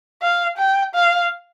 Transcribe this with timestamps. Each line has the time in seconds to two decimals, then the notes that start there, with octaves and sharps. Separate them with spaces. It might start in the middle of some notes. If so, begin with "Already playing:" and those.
0.22 F5
0.58 G5
0.94 F5